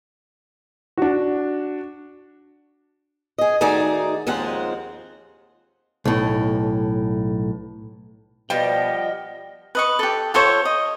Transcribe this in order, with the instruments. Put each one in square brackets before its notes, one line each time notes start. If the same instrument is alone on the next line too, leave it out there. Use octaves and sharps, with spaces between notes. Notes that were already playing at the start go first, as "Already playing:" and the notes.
[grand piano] D4 F#4
[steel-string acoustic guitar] G#4 D#5
D#3 A3 D#4 F#4 G#4 D5
D#2 F3 G#3 C4 F#5
[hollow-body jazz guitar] B1 A2
[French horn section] B2 D5 [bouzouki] F3 G3 B3 [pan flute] D#5 [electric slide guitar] G5
[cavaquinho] B4 D#5 C#6
G4 A4
F4 A4 C5 C#5
D#5